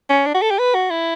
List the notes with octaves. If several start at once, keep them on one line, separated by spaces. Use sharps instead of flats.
C#4
D4
F#4
A4
G4
B4
F#4
E4